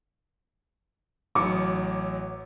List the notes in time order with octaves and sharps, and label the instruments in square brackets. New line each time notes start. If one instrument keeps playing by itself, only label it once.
[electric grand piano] A1 F#3 C#7 [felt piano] D6